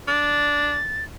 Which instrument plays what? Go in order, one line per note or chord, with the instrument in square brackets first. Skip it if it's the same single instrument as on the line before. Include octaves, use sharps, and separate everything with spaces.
[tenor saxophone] D4 [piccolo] A6